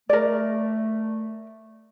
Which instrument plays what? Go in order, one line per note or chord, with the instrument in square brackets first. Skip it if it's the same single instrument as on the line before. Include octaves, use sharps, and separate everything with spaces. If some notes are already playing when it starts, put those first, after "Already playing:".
[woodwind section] A3 [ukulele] A#4 D5